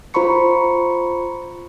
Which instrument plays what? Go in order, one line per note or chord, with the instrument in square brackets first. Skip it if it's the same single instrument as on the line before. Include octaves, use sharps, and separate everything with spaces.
[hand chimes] F4 C5 A#5 B5 C#6 C#7